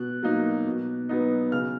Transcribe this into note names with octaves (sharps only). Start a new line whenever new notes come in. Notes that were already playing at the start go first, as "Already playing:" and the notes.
Already playing: B2 F#6
F#3 A#3 D#4
B2
F#3 B3 D#4
C#3 F6